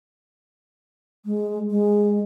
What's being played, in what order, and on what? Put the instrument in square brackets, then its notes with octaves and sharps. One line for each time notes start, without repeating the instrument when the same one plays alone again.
[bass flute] G#3
G#3